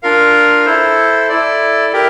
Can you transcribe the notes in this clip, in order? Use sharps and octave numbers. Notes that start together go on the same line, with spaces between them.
D4 F4 A#4 F5
E4 A4 C5
E4 A4 D5
E4 G4 A#4 E5 G5